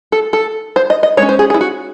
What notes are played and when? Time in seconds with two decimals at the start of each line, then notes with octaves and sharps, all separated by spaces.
0.12 A4
0.33 A4
0.76 C5
0.90 D#5
1.03 D#5
1.17 G#3 C#4 C#5
1.29 C5
1.39 G#4
1.50 G#4
1.54 E4
1.61 F#4